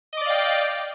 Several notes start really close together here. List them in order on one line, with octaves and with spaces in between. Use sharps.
D#5 D6 D5 F5 G5